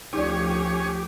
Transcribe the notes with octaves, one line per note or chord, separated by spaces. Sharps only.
D2 F3 C#4 D#4 G4 G#4 C#5 D5